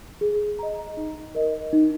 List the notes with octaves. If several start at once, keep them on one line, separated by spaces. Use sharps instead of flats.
G#4
D#5 A#5
D#4
A#4 D#5
D#4